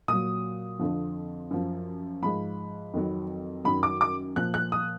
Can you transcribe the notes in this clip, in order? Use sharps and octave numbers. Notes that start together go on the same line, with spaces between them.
A#2 F#3 D#6
F2 D3 F3
F#2 F3
G#2 F3 B5
F2 D#3 F#3
F#2 D#3 F#3 B5
D6
D6
A#2 F3 F#6
F#6
D#6